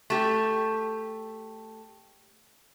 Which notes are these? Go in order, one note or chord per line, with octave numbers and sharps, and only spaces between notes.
A3 G4